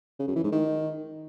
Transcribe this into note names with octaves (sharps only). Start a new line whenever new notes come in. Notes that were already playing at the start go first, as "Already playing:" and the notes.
C#3
F#2
E3
G#2
D#3